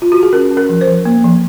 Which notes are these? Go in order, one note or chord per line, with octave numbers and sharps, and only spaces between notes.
F4
F#4
G#4
C#4 A#4
C#4
A#4
F3
C5
F3
A#3
F3